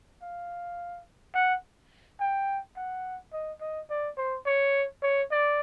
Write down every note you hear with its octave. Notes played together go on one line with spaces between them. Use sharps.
F5
F#5
G5
F#5
D#5
D#5
D5
C5
C#5
C#5
D5